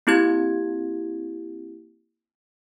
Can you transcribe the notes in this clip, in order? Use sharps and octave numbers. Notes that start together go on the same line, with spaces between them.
A#3 C4 E4 G4 G#6